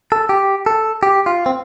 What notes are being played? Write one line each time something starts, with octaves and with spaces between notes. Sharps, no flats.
A4
G4
A4
G4
F4
C4